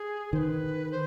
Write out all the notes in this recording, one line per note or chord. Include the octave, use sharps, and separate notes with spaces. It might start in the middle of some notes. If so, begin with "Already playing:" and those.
Already playing: G#4
D#3 C5
B4
C5